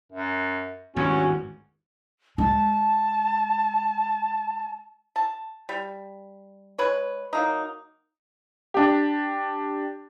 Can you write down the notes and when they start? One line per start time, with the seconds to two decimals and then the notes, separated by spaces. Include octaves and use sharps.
0.12 F#2
0.96 G#1 E2 G2 C#4 F#4
2.38 G#3 A5
5.16 A5
5.69 G3
6.78 G#3 B4 C#5
7.33 F#3 A#3 D#4
8.74 D4 G4